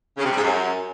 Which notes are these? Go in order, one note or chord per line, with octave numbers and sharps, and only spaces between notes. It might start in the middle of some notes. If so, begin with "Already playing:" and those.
C#3
C3
G3
G#2
F#2